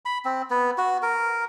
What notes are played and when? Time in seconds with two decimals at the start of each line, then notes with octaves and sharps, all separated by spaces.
0.05 B5
0.25 C4
0.50 B3
0.78 F#4
1.02 A#4